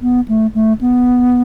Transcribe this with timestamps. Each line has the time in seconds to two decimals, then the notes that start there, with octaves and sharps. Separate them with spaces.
0.02 B3
0.28 A3
0.55 A3
0.81 B3